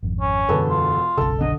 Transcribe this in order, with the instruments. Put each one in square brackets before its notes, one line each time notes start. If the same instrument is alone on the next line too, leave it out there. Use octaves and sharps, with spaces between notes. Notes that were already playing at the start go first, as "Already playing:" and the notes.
[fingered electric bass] G#1 F2
[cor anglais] C#4
[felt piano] E1 A4 B4 [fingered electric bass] F#2 D3
[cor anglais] F4
[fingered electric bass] F#1 B1 C#3 [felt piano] A4 A5
[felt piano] D3 [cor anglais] D#5